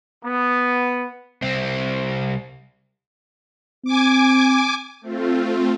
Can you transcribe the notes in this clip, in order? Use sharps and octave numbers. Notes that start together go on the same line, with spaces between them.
B3
C2 C4
C4 G#5 D6
A3 C4 F4